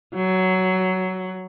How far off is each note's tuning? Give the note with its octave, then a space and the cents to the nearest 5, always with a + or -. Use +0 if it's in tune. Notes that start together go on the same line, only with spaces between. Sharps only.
F#3 +10